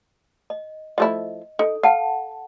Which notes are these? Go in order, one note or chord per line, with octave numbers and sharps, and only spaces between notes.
D#5
F3 A3 E4 D#5
D#4 A4
F5 F#5 A5